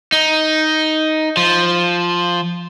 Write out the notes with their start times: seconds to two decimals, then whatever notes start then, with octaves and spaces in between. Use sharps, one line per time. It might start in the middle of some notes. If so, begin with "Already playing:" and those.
0.12 D#4
1.37 F3